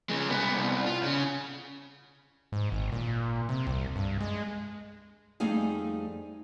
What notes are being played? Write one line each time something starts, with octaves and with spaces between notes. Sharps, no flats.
C#3 G#3
C2 B3
C2
F4
C#3
G#2
G#1
A#2
C3
C2
G2
G#3
F2 G3 A3 D#4 G#4 F5